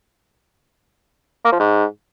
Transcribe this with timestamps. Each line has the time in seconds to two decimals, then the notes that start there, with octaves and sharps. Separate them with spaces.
1.45 A#3
1.52 F3
1.60 G#2